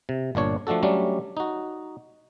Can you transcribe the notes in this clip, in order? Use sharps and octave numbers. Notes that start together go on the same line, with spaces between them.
C3
G1 A#2 D4 C#5
F3 A3 D4 F#4 A4
F#3 G3 A3 C#4 D4
D#4 F#4